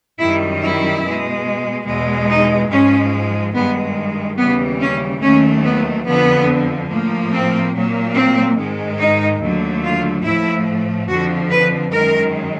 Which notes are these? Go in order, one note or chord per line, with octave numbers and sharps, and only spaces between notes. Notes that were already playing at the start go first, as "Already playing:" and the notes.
F#2 D#3 G3 E4
E4
B2 G#3
E2 B2 G#3
D#4
G#2 F3 G#3 C#4
G2 D#3 G#3 B3
D#2 C#3 E3 G3 B3
C#4
D#2 D#3 F#3 A3 C#4
B3
F2 D3 F3 B3
A2 F3 A#3
C4
A#2 F#3 A#3
C4
G#2 D#3 G#3
D#4
D#2 D3 F#3 A3
F4
A2 F3 A3 E4
F2 D3 F3 F#4
B4
F#2 D#3 G#3 A#4